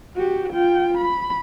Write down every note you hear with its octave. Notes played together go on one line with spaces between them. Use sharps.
F#4 G4
F4 G5
B5